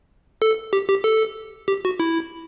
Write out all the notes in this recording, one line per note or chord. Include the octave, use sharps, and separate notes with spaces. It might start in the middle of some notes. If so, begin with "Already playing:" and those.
A4
G4
G4
A4
G4
F#4
E4